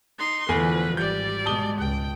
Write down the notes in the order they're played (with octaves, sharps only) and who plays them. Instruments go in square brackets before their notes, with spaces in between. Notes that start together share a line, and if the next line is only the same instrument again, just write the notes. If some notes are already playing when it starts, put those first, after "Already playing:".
[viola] D#4 C6
[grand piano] E2 A3 G#5 [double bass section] D3 E3 F3 [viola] B4
[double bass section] G#1 [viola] G3 D5 [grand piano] G6
[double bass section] B2 G#3 [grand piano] A5 D#6 G7
[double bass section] C#2 [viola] G5